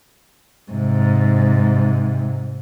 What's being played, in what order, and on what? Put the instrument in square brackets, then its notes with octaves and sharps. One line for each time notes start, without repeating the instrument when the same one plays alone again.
[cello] G#2 [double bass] C3